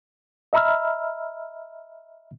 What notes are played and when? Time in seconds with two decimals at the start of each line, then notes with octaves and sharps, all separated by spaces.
0.53 D#5 E5 A#5 B5 E6 F6